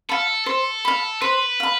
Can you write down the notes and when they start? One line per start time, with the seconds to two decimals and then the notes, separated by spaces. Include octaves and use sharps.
0.09 A4 F5 B5
0.46 A4 C5
0.85 F5 B5
1.21 B4 C5
1.60 F5 B5